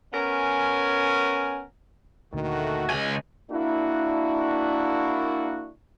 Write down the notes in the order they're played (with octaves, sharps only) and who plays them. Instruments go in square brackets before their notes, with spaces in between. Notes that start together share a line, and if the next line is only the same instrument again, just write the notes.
[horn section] B3 C#4 A#4 G#5
[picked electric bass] D2 A#2 D3 [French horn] D#3 [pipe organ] A3 F#4
[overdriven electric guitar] C#2 G#5 [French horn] G#3
[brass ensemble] A#3 D4 E4 F#4